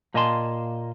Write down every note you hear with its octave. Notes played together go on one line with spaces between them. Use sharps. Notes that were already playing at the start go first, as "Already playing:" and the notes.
A#2 A#3 D#5 G#5 A5 C6